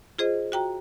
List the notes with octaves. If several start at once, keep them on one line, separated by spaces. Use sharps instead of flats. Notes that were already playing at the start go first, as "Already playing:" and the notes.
F4 G#4 C5 D#5
F#4 G5 A#5